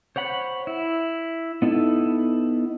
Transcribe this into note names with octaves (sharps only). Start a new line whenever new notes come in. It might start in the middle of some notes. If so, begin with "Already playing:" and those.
C5 C#5 F#5 B5
E4
B3 D#4 E4 A4